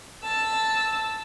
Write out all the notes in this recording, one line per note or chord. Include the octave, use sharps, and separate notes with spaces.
A5 E6